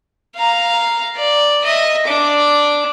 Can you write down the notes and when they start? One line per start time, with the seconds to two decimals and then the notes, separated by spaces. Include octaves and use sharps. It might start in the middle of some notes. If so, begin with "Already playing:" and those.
0.36 F5 A#5
1.17 D5
1.64 D#5 E5
2.06 D4 D6